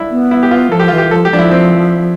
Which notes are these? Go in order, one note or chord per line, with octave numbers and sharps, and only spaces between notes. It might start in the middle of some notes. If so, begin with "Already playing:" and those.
Already playing: D4 E4
B3
E4
G4
F4
F3 A4
G4
E3 F4
G4
F3 A4
G4
F3 D4
E4
C4